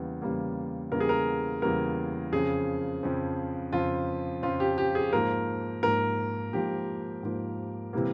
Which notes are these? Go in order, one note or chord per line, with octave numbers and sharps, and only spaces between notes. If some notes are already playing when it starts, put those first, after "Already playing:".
Already playing: E2 C#3 G3 A#3
E2 C#3 G3 A#3
E2 C#3 G3 A#3 A#4
G#4
A#4
E2 C#3 G3 A#3 A#4
F2 C#3 F3 G#4
F2 C#3 F3
F2 C#3 F3 F4
F2 C#3 F3 F4
G4
G4
G#4
G#2 F3 A#3 A#4
G#2 F3 A#3 A#4
G#2 F3 A#3 G4
G#2 F3 A#3
C3 E3 G3 A#3